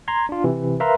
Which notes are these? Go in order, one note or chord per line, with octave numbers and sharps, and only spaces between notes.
A#5 C6 G#6
D4 F4
C3 E3
A#4 B4 E5 F5 A#5 C6